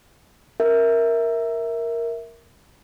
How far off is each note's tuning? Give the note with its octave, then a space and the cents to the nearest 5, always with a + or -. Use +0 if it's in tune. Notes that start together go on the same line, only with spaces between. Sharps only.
A#4 +0 E5 -10